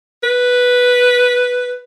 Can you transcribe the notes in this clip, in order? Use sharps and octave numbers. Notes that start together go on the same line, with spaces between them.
B4